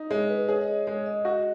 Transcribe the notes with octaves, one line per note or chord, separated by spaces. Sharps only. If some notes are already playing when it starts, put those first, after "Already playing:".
Already playing: D#4
G#3 C#5
B4
G#4 C#5
D#5
C#5
G#3 C#5
D#5
F#4